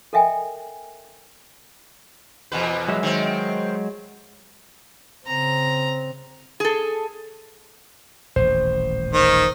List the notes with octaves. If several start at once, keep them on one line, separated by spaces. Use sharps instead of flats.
A4 A#4 D#5 E5 G5 G#5
E2 B2 B4
F#3 G#3 E5
D#3 C4
C#3 C4 A#5
G#4 A4
D#1 A1 C5
D#3 C5